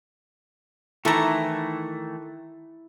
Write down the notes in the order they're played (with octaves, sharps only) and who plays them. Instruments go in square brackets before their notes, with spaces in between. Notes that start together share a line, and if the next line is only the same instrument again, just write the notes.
[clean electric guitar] D#3 E3 A3 [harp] E4 [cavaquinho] A4 A#5